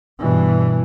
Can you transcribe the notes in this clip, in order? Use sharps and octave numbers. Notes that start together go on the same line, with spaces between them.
G2 B2 E3